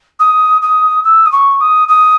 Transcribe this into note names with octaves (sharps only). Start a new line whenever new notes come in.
D#6
D#6
E6
D#6
C#6
D#6
D#6